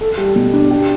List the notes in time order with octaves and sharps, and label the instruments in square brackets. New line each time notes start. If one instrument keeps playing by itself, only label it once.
[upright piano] A4
G3
B2
D4
G4